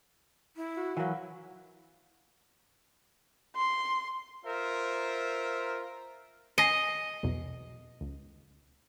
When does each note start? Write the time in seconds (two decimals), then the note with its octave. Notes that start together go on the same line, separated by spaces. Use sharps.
0.57 E4
0.77 F#4
0.97 E3 F#3 A#4 F5 F#5
3.56 C6
4.46 F4 A#4 C5 E5
6.58 D#5 G#5 A#6 C7
7.23 B1 E2 B2
8.01 C#2